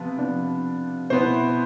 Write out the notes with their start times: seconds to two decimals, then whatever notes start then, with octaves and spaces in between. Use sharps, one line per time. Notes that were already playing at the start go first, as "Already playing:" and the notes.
Already playing: C3 F3 B3
0.18 C3 F3 B3 D4
1.10 B2 B3 E4 C5